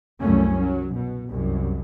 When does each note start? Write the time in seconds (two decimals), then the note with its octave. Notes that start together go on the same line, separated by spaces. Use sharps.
0.20 C2 F#2 A3 C#4
0.59 F#3
0.94 B2
1.29 C2 F#2